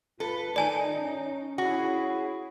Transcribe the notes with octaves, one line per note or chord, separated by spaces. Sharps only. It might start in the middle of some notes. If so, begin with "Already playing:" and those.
F4 A4 B4
D#3 D#4 D5 G#5 A5
C#4
E4 F#4 G#4